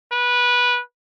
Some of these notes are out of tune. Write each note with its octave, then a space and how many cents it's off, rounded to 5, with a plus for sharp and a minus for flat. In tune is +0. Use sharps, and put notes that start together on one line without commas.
B4 -15